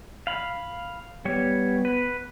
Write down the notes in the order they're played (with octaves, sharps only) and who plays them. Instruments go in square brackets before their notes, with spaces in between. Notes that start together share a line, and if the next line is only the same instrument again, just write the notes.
[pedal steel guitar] F5 B5
[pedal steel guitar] G3 C#5 [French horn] B3
[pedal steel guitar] B4